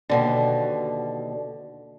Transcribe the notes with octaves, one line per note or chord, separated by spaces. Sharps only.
D#2 B2 D3